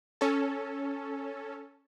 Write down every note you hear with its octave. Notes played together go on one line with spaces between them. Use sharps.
C#4 A4